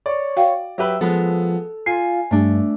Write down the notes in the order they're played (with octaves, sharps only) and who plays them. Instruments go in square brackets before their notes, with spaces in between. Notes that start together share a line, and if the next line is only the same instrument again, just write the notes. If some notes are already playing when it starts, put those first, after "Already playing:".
[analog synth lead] C#5 [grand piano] D5
[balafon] F#4 F5 G5
[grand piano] F#3 G4 B4 [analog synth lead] E5
[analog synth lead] F3 [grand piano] G#3 B3 [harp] A4
[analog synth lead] F4 [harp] G#5 [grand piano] C7
[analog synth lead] G2 [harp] A3 D4